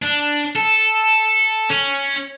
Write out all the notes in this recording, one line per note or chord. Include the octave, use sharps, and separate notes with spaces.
D4
A4
C#4